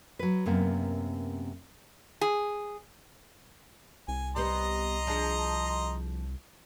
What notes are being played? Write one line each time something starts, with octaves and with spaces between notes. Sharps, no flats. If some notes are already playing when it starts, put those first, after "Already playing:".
F#3 B4
F#2 C3 A#3 B3
G#4
C2 G#5
G3 B3 C5 D#5 A#5 C6
F3 D4 G#4